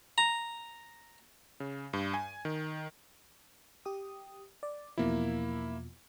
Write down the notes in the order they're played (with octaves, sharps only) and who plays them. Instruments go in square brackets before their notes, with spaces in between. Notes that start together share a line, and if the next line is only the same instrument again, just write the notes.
[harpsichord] A#5
[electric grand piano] C#3
G2
G#5
D#3
[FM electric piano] G4 D#6
D5
[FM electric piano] E2 B2 F3 [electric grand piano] A#3 E4